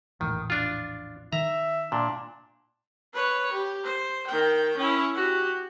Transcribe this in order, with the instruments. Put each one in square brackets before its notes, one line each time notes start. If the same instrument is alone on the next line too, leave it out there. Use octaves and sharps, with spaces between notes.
[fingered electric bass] A#1 E2 A2 [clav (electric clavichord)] D#3
[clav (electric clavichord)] D4 F4
[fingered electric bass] D#3 [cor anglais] E5 [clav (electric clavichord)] A#5
[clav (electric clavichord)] A#2 [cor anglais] D4
[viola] B4 C#5
G4
C5
D#3 G5
C#4 E4
F#4 G4